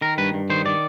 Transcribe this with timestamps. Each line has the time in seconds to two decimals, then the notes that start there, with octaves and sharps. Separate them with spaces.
0.01 D#3 A#4
0.18 G2 B4
0.34 G2
0.50 D#3 C5
0.66 D#3 D5